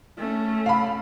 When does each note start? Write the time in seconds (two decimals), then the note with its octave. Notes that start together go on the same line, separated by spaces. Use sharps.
0.18 A3 C#4
0.66 F5 B5